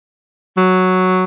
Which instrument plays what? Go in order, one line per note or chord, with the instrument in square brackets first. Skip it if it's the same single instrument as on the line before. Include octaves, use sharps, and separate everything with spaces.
[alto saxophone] F#3